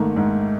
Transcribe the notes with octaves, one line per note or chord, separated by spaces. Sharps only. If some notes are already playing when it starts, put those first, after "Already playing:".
Already playing: G#2 D#3 A3 A#3
G#2